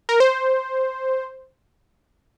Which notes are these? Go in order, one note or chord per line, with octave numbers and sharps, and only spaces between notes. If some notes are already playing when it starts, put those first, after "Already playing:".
A#4
C5